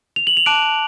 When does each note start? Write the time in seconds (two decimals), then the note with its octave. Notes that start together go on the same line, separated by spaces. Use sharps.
0.16 F7
0.27 F#7
0.37 F7
0.46 A5 D6 F#6 D7